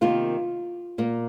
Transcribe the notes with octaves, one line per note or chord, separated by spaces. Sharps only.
C3 D#3 A#3 F4
A#2 A#3